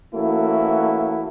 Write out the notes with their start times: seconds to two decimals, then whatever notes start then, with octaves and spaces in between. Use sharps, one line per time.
0.14 E3 A3 A#3 C#4 E4 F#4